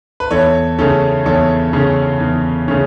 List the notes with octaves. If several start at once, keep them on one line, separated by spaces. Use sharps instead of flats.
B4
E2 A4 C#5
C#3 A3 C#4 A4
E2 A4 C#5
C#3 A3 C#4
E2
C#3 A3 C#4